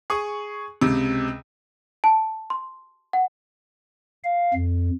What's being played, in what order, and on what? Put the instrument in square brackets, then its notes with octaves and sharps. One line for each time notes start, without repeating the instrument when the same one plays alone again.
[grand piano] G#4 C#6 D#6
C#2 C3
[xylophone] A5
C6
F#5
[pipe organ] F5
F2